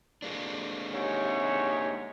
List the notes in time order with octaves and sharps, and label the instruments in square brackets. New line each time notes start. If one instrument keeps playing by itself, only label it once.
[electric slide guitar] G#3 A#3 D4
[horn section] G#2 C3 C#5